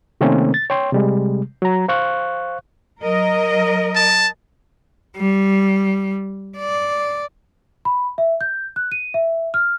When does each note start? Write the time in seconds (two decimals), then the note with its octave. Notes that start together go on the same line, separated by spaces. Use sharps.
0.21 C3 D#3 A3 A#3 C4 C#4
0.54 A6
0.70 C#5 G5 C6
0.93 C3 G3 G#3
1.62 F#3 A#5
1.88 C5 F5 C#6 F#6
3.01 F#3 A#4 D#5
3.96 A5
5.17 G3
6.57 D5
7.85 B5
8.18 E5
8.41 G6
8.76 F#6
8.92 D#7
9.14 E5
9.54 F6